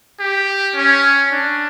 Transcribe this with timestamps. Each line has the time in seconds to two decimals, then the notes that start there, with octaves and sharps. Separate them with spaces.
0.20 G4
0.75 C#4
1.32 D4